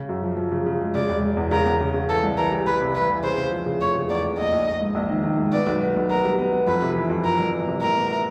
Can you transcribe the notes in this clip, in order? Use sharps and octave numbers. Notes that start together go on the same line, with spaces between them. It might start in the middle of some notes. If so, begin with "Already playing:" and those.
Already playing: C#3
F#2
F3
F3
C#3
C#3
G#3
C#3 D5
E1
E1
E2
C#3 A#4
E2
C#3
C#3
E3 A4
C2
E3 A#4
G3
G3 B4
C3
E3 B4
E3
C#3 C5
C#3
F3
C#3
F1 C#5
C#3
E2 D5
F1
A#1 D#5
A#1
A#1
G#2
A#1
D#3
D#3
G#2
B3 D5
B1
B3
B1
B3 A#4
G3
B3
B3
F2 B4
C3
E3
F2
F2 A#4
G1
E3
C3
A2 A#4
B3
E4